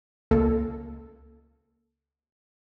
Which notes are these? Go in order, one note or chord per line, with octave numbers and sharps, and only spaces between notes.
C#2 A#3 A4